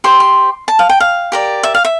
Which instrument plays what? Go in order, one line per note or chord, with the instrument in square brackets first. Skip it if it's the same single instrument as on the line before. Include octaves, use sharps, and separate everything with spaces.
[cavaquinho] G4 C5 C6
C6
A5
F5
G5
F5
G4 A#4 D5
E5
F5
E5